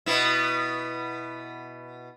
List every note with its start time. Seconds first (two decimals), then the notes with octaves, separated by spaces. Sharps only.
0.06 B2 B3 E4